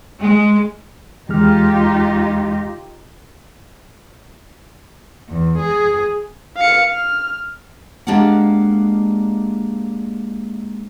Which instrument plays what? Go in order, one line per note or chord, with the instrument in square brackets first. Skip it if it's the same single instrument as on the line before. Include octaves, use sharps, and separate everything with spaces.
[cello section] G#3
[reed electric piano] E2 G#3 F6 [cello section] D#4 F4 G4
[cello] E2
G#4
[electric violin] F5 C#7
F6
[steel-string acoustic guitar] G#3 A#3 D4 G4 F5 F#5